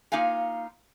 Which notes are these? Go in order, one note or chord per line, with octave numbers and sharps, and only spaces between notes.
A#3 D#4 F4 F5 G#5